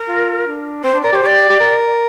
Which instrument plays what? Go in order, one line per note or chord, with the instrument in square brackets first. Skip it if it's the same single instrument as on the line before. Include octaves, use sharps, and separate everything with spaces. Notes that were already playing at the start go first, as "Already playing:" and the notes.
Already playing: [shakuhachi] A#4
[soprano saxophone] F4
D4
[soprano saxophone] C4 [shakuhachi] C5
[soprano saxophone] D4
[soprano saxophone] A#4 [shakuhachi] D5
[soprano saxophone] G4
[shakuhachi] C5
[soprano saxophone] G4 [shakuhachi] D5
[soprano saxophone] G4
A#4